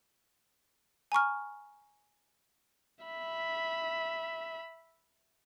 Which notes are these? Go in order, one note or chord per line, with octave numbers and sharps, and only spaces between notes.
G#5 A#5 C#6 F6
E5 B5